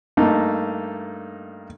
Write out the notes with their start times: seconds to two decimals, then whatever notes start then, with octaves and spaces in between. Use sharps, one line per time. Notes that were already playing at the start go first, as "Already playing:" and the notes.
0.17 G2 A3 A#3 D#4